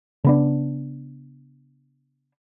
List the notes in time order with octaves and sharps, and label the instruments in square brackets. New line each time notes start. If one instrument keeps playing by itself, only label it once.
[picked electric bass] C#3 B3 D4